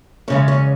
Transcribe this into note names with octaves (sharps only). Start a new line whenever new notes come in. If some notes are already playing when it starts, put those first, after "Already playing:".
E2 C#3 G#3 C#4
C#4